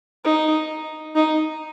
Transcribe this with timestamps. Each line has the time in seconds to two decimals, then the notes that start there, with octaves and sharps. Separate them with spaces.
0.25 D#4
1.16 D#4